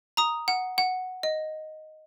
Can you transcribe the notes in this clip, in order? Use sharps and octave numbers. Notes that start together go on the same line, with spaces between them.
A#5 D#6
F#5
F#5
D#5